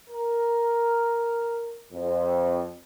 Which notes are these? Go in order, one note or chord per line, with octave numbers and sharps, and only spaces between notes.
A#4
F2